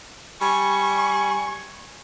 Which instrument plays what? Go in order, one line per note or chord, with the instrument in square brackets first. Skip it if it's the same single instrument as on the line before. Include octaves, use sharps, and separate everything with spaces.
[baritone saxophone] G3 [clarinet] G#5 [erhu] C#6